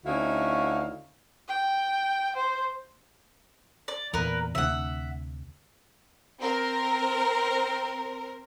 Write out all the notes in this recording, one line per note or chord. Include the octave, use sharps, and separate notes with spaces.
D2 C#4 D#4 E4 F#4 F5
G5
C5
D5
E2 A#2 A#4 B4
D2 C3 E5 F#5
C4 A#4